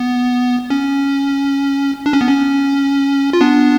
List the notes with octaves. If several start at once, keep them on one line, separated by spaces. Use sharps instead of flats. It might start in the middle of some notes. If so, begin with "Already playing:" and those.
Already playing: B3
C#4
D4
C#4
B3
C#4
F4
B3 D4